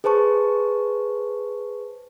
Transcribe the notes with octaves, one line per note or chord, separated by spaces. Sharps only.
G#4 B4 C5 A5 C#6